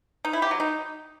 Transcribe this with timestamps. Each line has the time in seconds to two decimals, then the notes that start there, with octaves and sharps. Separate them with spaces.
0.25 D#4
0.33 E4
0.42 G4
0.51 F#3
0.60 D#4